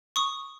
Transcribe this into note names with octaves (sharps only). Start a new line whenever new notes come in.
C#6 D#6